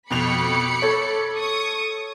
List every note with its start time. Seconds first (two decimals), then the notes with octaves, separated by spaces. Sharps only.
0.10 F2 B2 B5 D6 C#7 F7
0.82 A4 C#5
1.37 C#6 D#6